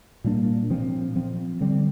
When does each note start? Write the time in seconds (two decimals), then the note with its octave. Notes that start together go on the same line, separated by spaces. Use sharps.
0.24 A#2 G3 A#3 D4
0.70 A#2 F3 C4
1.16 F3 C4
1.61 D3 G3 C4